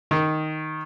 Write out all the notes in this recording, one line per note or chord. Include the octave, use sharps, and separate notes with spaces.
D#3